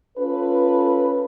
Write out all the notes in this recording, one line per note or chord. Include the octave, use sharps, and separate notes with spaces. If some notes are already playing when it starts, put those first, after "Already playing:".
C#4 F4 A4 B4